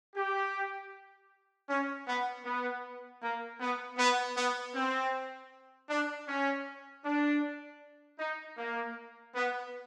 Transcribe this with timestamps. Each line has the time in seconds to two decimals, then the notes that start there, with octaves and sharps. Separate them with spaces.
0.15 G4
1.69 C#4
2.07 B3
2.45 B3
3.22 A#3
3.60 B3
3.98 B3
4.36 B3
4.75 C4
5.90 D4
6.28 C#4
7.04 D4
8.19 D#4
8.58 A#3
9.35 B3